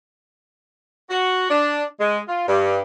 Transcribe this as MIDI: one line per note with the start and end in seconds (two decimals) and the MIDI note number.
1.10 1.49 66
1.50 1.84 62
2.00 2.19 56
2.28 2.45 65
2.47 2.79 43